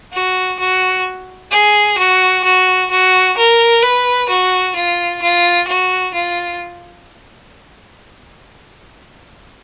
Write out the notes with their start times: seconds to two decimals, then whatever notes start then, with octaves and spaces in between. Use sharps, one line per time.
0.13 F#4
0.59 F#4
1.51 G#4
1.98 F#4
2.44 F#4
2.90 F#4
3.37 A#4
3.82 B4
4.29 F#4
4.76 F4
5.22 F4
5.67 F#4
6.14 F4